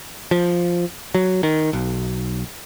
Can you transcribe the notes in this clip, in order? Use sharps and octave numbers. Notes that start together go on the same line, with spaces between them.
F3
F#3
D#3
B1